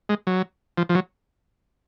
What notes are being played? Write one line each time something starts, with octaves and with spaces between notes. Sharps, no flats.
G#3
F#3
F3
F3
F#3